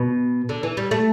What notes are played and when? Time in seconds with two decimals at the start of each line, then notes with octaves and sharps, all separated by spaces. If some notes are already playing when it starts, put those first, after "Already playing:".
Already playing: B2
0.49 D3
0.63 E3
0.77 G3
0.91 A3